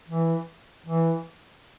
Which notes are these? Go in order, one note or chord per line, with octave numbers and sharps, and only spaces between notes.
E3
E3